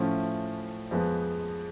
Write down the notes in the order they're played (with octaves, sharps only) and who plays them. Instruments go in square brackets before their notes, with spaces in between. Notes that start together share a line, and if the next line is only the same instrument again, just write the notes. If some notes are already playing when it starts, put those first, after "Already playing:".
Already playing: [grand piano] A2 F3 A3 C#4
F2 F3 G#3 B3